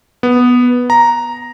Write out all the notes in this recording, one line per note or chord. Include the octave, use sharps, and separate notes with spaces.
B3
A#5